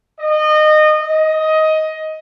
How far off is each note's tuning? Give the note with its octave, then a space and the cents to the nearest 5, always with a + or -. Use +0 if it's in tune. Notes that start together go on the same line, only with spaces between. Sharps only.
D#5 -25
D#5 +15